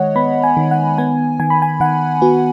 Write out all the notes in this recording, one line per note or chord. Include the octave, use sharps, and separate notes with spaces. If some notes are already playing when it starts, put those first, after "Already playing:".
Already playing: D#3 G#3 C#5 D#5 F#5
B3 B5
G#5
D#3
F#5
B3 G#5
D#3 G#5
B5
G#5
D#3 F#5
B3 F#4